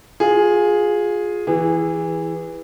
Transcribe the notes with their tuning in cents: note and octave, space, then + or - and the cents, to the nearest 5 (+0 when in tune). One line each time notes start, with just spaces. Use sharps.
F4 +25 G#4 +0
E3 +0 G#4 -25